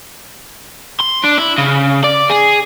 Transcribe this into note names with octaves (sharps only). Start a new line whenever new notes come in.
C6
D4
E4
C#3
D5
G#4